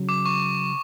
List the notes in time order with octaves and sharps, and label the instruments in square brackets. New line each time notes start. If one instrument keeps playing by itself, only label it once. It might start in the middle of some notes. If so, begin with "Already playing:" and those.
Already playing: [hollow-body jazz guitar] C#3 F#3
[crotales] D6
C#6